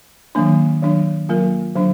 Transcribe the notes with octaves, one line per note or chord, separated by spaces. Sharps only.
D#3 F#3 A#3 D4
D#3 F#3 D4
F#3 A#3 F4 A#4
D3 F#3 D4